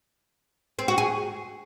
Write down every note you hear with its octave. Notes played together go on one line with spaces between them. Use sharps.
C4
F#4
G#4